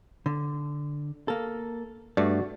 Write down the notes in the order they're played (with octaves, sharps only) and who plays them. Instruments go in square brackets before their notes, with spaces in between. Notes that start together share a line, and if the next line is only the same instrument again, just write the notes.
[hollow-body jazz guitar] D3
A#3 A4
[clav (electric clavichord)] G2 A3 [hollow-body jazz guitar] F#4 D5